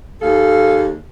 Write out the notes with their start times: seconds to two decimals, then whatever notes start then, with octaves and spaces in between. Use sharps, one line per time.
0.21 D#2 G#4 A4 F5